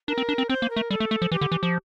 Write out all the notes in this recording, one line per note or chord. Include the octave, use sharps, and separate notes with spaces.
D4 A#4
C4
D4
C4
C4 C5
A#3
A#4
A3
G3 A4
A3
A3
F3
E3 G4
D3
E3
F3